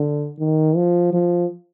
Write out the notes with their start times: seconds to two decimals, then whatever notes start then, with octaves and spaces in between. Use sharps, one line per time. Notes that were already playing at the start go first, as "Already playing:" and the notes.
Already playing: D3
0.40 D#3
0.76 F3
1.13 F3